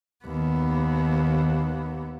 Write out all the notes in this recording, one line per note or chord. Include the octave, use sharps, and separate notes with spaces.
D#2 B3